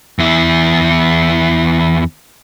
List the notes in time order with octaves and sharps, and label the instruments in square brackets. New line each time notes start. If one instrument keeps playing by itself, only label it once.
[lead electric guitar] E2 E4